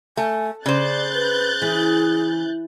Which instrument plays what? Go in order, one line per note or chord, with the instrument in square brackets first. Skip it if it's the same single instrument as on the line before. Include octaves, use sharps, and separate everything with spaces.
[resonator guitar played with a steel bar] A3 [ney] G#5
[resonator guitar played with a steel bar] C#3 C5 [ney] D5 [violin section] F#6 G6 A6
[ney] B4
[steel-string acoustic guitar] E3 [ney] G#4